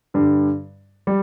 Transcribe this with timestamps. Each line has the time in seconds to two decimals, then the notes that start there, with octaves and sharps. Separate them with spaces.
0.14 G2 D3 G3
1.07 G3